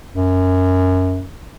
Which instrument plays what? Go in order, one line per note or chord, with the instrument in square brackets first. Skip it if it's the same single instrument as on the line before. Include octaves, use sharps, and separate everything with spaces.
[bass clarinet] F#2